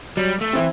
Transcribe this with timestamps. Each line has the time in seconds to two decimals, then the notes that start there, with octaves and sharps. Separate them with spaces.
0.17 F#3 G3
0.41 A3
0.53 E3 C4 E4